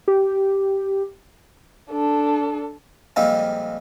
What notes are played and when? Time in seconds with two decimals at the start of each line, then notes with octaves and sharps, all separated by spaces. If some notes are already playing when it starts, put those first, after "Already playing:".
0.08 G4
1.90 D4 A4
3.16 F2 A#2 G3 G#3 C4 F4